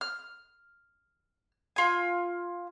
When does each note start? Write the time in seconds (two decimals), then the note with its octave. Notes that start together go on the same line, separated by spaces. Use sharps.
0.01 F6
1.76 F4 G#5